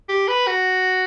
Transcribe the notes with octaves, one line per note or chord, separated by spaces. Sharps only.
G4
B4
F#4